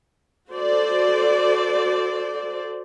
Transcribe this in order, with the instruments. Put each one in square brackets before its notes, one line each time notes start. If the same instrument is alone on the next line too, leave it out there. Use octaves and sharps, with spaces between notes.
[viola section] F#4 A4 C5 D5